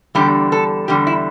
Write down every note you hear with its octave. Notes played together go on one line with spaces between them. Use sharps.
E2 D3 G3 G4
A4
E2 D3 G3 G4
E4